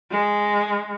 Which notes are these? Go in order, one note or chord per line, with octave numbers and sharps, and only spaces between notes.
G#3